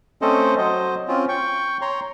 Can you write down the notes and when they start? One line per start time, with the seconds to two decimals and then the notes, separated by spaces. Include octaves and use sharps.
0.22 A3 C4 C#4 A4 C5 D#5
0.58 F#3 C5 D#5
1.08 C4 C#4 F4
1.29 G5 C#6
1.81 C#5 A#5 C6